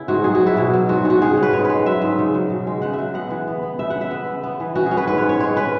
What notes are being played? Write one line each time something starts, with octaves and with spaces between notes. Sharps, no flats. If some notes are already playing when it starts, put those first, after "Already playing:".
Already playing: C#3 B3 E4
G#2 F#4
F#3 G#4
F#4
F#3
E4
B2
F#3
G#2 F#4
G#2 F#4
C#3 G#4
C#4
B4
G#2 C#5
G#3 B4
F#3 E5
G#2
C#3
F#3
B2
G#3
C#3 F#5
E5
F#3
B3 F#5
E3
B3
B3
C#3 E5
C#3 F#5
E5
B3
C#3
B3
E3
C#4 F#4
G#4
C#4
B4
G#2 B4
C#5
C#4
C#5
G#3 C#5
C#4 B4